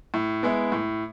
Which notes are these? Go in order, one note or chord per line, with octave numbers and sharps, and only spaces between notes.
A2
G#3 B3 E4
A2